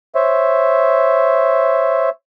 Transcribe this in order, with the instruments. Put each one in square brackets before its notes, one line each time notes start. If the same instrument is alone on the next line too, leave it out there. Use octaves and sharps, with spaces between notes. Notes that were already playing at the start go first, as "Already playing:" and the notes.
[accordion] C5 C#5 E5